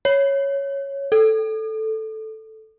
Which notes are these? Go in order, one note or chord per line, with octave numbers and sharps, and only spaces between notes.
C#5
A4